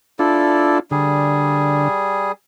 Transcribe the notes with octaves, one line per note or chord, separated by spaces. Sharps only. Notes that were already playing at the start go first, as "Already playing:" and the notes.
D4 E4 F4 A4 D5
D3 G3 G#4